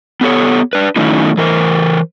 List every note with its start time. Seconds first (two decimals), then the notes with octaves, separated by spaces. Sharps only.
0.21 B3 G4 A4 C#5
0.73 D4 B4
0.96 D#3 F#3 A3 C#4 D#4 E4
1.37 E3 A#4 C5